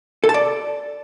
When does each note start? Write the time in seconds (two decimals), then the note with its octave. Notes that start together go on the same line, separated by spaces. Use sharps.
0.24 A4
0.29 A5
0.34 D5